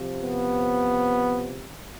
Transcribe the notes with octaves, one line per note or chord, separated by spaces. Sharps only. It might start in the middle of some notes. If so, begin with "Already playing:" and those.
Already playing: C3 F3
B3